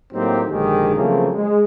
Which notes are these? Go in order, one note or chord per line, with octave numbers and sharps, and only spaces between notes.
A2 F#3 A#3 C4 D#4 G4
A#1 G#2 D3 D#3 G4 G#4
C#3 F3 F#3 A3 A#3 C4
G#3